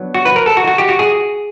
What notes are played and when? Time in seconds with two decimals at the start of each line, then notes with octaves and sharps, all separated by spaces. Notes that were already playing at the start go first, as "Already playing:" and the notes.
Already playing: F#3 B3 D4
0.14 F#4
0.25 B4
0.36 A#4
0.46 A4
0.57 F#4
0.68 F#4
0.78 G4
0.89 F#4
0.99 G#4